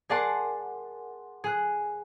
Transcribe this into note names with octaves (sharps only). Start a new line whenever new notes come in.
G#4 A#4 D5 F#5 A5 C6
G#4 F#6